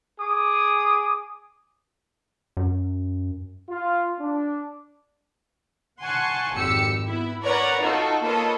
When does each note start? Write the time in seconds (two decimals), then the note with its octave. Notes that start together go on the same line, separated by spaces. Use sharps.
0.19 G#4 D6 D#6
2.57 F#2
3.68 F4
4.19 D4
6.01 F#5 G#5 A5 C6 C#6
6.53 G#1 F2 G4 E6 C#7
7.06 B3 E4
7.43 A#4 B4 C#5 D5 F#5 A#5
7.80 D#4 F4 F#4 A4
8.22 A#3 F4 A4 B4 C#5 D#5